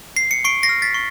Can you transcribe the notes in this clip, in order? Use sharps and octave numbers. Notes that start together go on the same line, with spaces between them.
C7
C#7
C#6 C7 D7
A#6 C7
F6
A6 B6
C#6